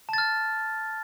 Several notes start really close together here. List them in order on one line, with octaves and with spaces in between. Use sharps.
A5 A6 F6